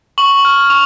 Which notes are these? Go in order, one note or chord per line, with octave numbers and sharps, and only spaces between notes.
C#6 F#7
F6
C#6 F7